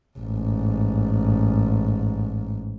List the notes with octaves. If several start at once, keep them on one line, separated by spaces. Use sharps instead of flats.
A1 G#2